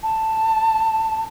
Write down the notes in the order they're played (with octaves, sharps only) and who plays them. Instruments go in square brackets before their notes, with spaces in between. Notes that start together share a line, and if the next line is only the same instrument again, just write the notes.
[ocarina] A5